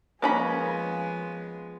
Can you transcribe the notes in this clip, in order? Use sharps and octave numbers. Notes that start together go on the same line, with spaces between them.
F3 G#3 A#3 B3 C#4 B5